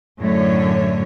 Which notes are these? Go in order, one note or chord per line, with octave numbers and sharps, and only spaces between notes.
F#2 A2 D3 F#3 A3 C#5